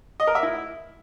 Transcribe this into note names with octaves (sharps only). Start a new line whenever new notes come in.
D#5
A#4
E5
E4